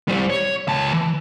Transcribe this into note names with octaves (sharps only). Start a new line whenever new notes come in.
G3 C5
C#5
C#2 A5
E3